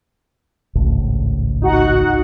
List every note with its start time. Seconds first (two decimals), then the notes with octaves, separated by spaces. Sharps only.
0.75 G#1 C#2 A2
1.62 D#4 F#4 F#5